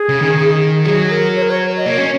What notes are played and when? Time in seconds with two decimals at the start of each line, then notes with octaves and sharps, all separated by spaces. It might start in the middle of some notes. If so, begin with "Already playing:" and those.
Already playing: G#4
0.09 C#3
0.22 D#3
0.85 F#3 G#4
1.10 A#4
1.36 C#5
1.43 A#4
1.50 C#5
1.77 D#5
1.86 A#3 C#5
1.98 C#4